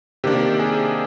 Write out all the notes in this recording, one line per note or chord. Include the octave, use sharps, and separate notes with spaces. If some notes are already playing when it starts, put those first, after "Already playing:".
C3 D#3 A#3 D4 G4
G#4